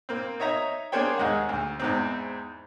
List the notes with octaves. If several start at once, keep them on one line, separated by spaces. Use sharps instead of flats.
A#3 C4
D#4 C#5 E5 A#5
A#3 D4 G#4 C5 C#5 G5
D#2 G#3 F#5
D2
E2 G#2 C4